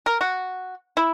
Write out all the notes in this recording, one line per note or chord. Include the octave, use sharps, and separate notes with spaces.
A#4
F#4
E4